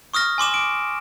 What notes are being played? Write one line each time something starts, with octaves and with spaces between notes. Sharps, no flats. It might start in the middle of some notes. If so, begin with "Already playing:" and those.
C#6 D#6 F6 A#6
G#5 C6 D6 E7
D7